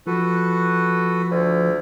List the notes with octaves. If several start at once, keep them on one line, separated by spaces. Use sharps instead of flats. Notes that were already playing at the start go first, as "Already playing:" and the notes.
F3 F#4 A4 B4
D2